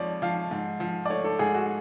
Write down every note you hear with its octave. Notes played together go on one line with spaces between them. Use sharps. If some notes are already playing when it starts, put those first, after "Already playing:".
Already playing: F2 F3 G#3 C#5 D5
F3 F5
G#2
F3
D5
A3 C#5
A4
G#2 G#4
F#4